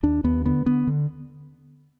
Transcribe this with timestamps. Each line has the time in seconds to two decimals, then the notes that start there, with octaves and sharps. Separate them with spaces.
0.03 D#2 D4
0.24 D#2 B3
0.45 D3 B3
0.66 D3 B3
0.87 D3